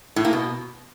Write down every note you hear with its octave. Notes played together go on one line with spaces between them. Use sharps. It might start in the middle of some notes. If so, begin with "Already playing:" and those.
A2
A#3
B2